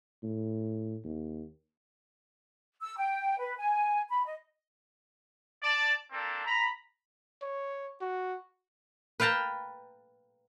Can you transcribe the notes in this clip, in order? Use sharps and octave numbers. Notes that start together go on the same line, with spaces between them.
A2
D#2
E6
G5
B4
G#5
B5
D#5
D5 A5
A#3 C4 D4 A4
A#5 B5
C#5
F#4
B4 F5 G5 A5 A#5